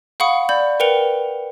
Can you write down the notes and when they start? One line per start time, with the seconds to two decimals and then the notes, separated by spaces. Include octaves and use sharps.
0.20 F5 F#5 B5 C#6 D#6 C#7
0.49 D5 B5 G6
0.80 A#4 B4 G5 C#7 F7 G7